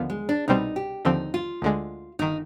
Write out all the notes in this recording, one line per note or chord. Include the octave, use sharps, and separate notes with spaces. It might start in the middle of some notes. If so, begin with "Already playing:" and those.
Already playing: D#2 D3 F3 B3 F4
G#3
D4
C2 B2 G3 C4 D#4
G4
D#2 D3 F3 C4 D#4
F4
D2 D3 G#3
G1 D#3 D#4